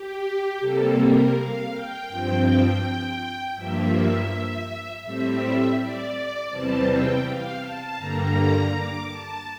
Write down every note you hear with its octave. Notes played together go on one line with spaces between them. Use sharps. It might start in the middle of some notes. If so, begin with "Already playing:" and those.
Already playing: G4
C3 G3 A#3 A4
A#4
F5
G5
G2 F3 C4
G2 F3 A#3 E5
A2 G3 C4 E5
D5
E2 C3 E3 G3 C4 A5
G5
F5
A5
G2 D3 G3 A#3 A#5
D6
A5